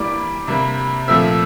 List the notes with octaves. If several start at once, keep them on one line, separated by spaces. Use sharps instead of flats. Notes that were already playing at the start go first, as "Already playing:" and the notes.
Already playing: E3 G3 A#3 D5 D6
C3 G3 A#3
A#2 F3 A3 C4 E5 E6